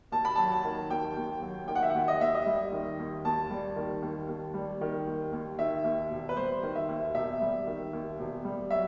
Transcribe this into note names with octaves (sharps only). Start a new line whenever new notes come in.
D#2 A5
B5
F#3 A5
A5
D#3
D#2 G5
D#2
F#3
D#3 G5
F#5
E5
D#2 F#5
D#5
D#2 E5
D#5
G3
D#3
D#2
D#2 A5
G3
D#3
D#2
D#2
G3
D#3
D#2
D#2
D#3 E5
D#2
E1
B4
G3 C5
D#3
E5
D#2
E1 E5
G3
D#3
D#2
E1
G3
F#3 E5